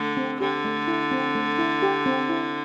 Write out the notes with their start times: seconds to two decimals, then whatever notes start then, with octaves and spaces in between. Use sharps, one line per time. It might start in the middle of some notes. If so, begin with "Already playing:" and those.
Already playing: D3 A3
0.17 C4
0.40 D3 G4
0.65 A3
0.88 E4
1.11 C4
1.35 A3
1.59 E4
1.82 G4
2.06 C4
2.29 E4